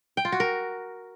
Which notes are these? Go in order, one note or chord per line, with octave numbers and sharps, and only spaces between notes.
G5
F4
F#4
A#4